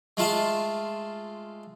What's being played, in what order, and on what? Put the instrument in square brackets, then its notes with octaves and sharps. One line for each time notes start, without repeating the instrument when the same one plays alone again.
[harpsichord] G#3 A3 F4 A5